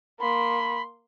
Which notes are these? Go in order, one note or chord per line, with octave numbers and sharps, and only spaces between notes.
A#3 B5 C6